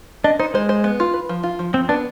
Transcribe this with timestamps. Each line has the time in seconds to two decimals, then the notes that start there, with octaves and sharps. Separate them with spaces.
0.24 D4 D#5
0.39 D#4 C5
0.54 G#3 C5
0.69 C5
0.84 B3
1.00 F4
1.14 B4
1.29 F3
1.43 F4
1.59 F3
1.74 F3 C4
1.89 B3 D4